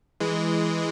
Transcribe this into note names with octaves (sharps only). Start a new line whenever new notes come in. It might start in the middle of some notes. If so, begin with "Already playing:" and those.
E3 G#3